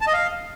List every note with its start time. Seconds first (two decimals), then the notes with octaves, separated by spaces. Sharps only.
0.01 A5
0.07 D#5
0.13 F5